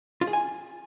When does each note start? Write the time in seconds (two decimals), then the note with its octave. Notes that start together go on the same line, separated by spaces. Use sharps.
0.21 F4
0.27 G#4
0.33 G#5